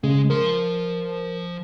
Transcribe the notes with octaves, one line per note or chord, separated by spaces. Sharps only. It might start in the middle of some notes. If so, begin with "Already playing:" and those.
C#3 G#3
F3 A#4 C6